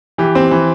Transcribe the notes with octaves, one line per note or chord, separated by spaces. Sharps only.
E3 G4
C4
E3